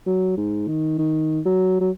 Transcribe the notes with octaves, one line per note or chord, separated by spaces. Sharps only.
F#3
G#2
D#3
D#3
F#3
F#3